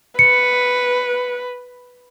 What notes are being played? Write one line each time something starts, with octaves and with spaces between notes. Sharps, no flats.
B4 C#7